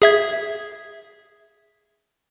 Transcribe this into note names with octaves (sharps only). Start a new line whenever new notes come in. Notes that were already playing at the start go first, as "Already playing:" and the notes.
G#4 E5 G#6